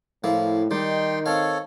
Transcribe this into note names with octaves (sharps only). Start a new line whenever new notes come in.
A2 F3 A#3 E4
D#3 G3 D#4 G5 C6
C4 A4 C#5 F5